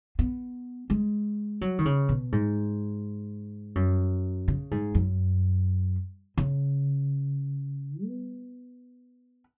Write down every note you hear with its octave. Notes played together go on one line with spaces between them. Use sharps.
B3
G#3
F#3
D#3
C#3
B2
G#2
F#2
C#3
G#2
F#2
C#3
B3